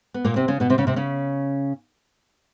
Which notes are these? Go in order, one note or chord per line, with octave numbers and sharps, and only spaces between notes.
B3
A#2 A#3
C3 C4
C#3 C#4
B2 B3
C3 C4
C#3 C#4
C3 C4
C#3 C#4